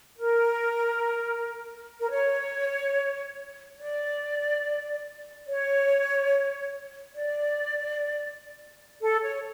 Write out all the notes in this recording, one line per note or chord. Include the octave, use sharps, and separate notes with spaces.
A#4
A#4
C#5
D5
C#5
D5
A4
C#5